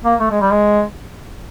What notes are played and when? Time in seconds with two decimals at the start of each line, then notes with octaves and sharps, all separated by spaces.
0.05 A#3
0.20 A3
0.31 G#3
0.41 G3
0.52 G#3